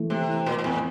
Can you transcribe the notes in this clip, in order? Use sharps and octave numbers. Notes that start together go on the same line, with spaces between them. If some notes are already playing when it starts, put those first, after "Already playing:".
Already playing: E3 A3
C3 A3
E3
A#2 E3
A#2
F2 A2